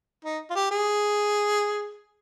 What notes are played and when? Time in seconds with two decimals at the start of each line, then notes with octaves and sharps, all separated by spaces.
0.25 D#4
0.50 F4
0.55 G4
0.71 G#4